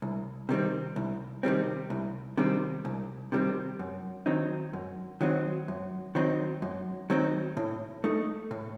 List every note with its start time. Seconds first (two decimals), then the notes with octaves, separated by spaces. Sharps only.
0.02 C2
0.49 C3 D#3 G3 C4
0.96 C2
1.43 C3 D#3 G3 C4
1.90 C2
2.37 C3 D#3 G3 C4
2.85 C2
3.32 C3 D#3 G3 C4
3.79 F#2
4.26 D#3 F#3 C4 D#4
4.73 F#2
5.21 D#3 F#3 C4 D#4
5.68 F#2
6.15 D#3 F#3 C4 D#4
6.62 F#2
7.10 D#3 F#3 C4 D#4
7.57 A2
8.04 A3 D#4
8.51 A2